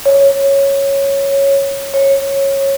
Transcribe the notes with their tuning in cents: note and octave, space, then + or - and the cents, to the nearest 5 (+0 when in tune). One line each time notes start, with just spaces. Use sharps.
C#5 -5
C#5 -15